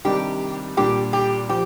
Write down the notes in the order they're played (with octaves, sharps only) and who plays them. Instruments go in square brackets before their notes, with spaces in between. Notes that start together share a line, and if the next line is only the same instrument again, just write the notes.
[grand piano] C3 D#3 G3 D4 [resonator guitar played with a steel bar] G4
[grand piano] A#2 G3 D4 [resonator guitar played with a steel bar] G4
[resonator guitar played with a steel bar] G4
[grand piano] F3 [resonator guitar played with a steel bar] G4